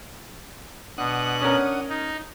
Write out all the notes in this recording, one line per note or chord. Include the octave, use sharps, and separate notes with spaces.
B2 D4 F#5 D#6 F#6
C#4 A#4
D#4